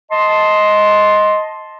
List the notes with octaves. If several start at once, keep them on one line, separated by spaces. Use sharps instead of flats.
D#5 A5 C6